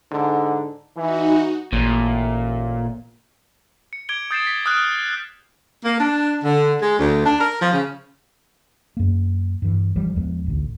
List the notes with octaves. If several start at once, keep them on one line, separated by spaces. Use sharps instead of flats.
G#2 D3
E3 D#4 F#4
A1 A#2
C#7
D6 G#6 D7 G7
D#6 G6 A6 C7 D7 E7
B6
D#6 F6 F#6 D7
A#3
D4
D3
G#3
D2
D4
A#4
F3
C#3
F#2 A#3
G2 E3
B1 E3 F3 G3
E2 F3 G#3
A1 D2